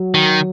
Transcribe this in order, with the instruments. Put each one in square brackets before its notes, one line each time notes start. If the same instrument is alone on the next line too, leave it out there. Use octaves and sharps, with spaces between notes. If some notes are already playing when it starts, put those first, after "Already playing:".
Already playing: [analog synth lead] F#3
[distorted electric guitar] D#3